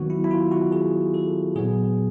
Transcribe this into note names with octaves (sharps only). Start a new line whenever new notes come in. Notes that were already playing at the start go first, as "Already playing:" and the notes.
Already playing: D#3 F#3 B3 F#4
E4
E4
F4
F#4
G#4
A4
A#2 F#3 B3 G#4